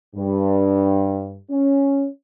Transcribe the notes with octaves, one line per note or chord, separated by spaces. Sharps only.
G2
C#4